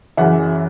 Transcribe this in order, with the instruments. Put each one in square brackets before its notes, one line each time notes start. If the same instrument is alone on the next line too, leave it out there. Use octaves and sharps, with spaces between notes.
[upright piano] F#2 C#3 E3 E5 F#5